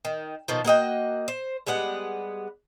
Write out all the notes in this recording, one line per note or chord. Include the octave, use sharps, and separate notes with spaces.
D#3
B2 D#3 F3
A#3 F#4 D#5 G5
C5
G3 G#3 B3 F#5